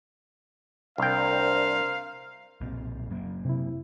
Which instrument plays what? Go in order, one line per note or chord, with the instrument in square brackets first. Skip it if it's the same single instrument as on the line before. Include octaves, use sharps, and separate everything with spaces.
[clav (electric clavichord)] C2 G5 [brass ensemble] D4 A#4 C5 [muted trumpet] F5
[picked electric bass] B1 A#2 C4
F#2 F#3 A#3
[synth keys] C3 E4